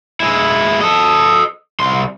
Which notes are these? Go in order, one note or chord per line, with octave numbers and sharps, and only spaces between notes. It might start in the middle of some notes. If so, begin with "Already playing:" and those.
G#3 E4
A4 D#5
C2 C6